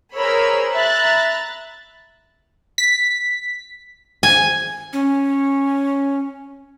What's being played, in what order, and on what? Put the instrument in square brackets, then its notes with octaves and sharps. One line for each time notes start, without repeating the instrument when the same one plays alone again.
[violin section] G#4 A#4 C5 C#5 B5 E6
E5 A#5 B5 F#6 A6
[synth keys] B6
[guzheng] G#5
[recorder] C#4